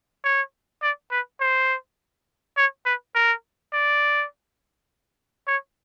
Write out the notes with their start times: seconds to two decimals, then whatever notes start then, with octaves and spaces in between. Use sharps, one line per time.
0.24 C#5
0.82 D5
1.11 B4
1.40 C5
2.57 C#5
2.85 B4
3.15 A#4
3.73 D5
5.47 C#5